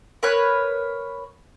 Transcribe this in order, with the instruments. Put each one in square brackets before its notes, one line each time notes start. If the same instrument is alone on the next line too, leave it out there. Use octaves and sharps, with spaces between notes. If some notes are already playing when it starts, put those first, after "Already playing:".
[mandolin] A#4 B4 C#5 F#6